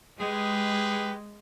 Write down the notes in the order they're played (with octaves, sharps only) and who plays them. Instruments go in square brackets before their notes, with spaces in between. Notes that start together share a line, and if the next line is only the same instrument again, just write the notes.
[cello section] G#3 [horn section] G4 G#4 B4